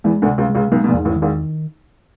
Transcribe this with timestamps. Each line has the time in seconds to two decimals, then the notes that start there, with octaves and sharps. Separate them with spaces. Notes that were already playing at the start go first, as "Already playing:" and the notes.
0.04 E2 E3 G#3
0.22 D2 D3
0.26 C3
0.38 C#2 C#3
0.49 G#3
0.55 C#2 C#3
0.71 B1 B2 G#3
0.84 B2
0.88 A#1 A#2
0.94 E2 G#2
1.05 A1 A2
1.16 D#3
1.22 G#1 G#2